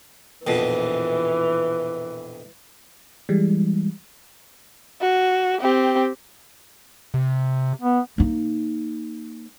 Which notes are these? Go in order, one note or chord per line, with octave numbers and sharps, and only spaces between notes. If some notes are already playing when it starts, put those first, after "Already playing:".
A#1 F2 B2 E3
E3 G3 G#3
F#4
C4 G4
C3
B3
A#3 D#4